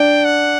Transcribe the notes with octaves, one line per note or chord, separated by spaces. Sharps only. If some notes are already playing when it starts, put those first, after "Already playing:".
Already playing: D4 G5
F#5